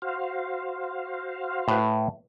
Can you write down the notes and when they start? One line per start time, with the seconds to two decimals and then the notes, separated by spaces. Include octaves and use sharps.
0.02 F#4 C5 F5
1.68 A2 B4